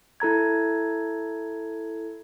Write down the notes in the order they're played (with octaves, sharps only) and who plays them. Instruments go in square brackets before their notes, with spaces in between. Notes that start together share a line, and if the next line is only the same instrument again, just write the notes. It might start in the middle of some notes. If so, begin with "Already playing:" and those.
[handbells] E4 A4 A#5 G#6